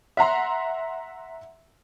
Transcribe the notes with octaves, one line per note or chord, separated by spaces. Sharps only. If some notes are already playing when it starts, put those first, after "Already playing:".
E5 F#5 A#5 C6